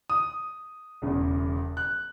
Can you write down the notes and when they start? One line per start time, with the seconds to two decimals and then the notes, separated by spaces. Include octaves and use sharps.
0.10 D#6
1.02 E1 E2 C#3
1.77 F#6